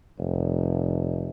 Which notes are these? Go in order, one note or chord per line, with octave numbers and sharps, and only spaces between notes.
F1